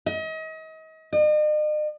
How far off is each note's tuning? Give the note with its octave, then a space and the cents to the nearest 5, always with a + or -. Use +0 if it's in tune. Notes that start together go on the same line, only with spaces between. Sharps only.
D#5 +35
D#5 -45